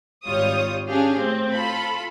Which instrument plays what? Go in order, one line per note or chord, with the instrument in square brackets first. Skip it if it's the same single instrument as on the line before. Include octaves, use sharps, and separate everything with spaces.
[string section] G#1 G3 F4 C#5 D#6
C#4 D4 G4 G#4 F5
A2 C4
F4 A4 B5